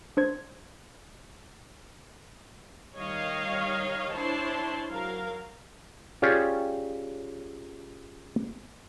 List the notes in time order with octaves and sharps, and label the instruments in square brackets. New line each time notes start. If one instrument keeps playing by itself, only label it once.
[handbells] D4 C5 G#6
[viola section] D#3 G3 C#5 D#5 F5
D4 E4 C5 C#5 A5 C6
F#3 A#4 F5
[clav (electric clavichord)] C#4 F4 G4 G#4 C#5 D5